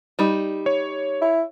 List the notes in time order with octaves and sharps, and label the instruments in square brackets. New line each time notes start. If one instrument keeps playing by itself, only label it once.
[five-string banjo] G3 D#4
[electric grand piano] C#5
[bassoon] E4